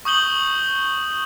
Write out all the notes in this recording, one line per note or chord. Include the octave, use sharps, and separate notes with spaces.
C#6 D#6 G6 F#7 G7